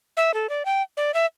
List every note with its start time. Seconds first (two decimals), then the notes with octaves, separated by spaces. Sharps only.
0.17 E5
0.34 A4
0.49 D5
0.65 G5
0.97 D5
1.14 E5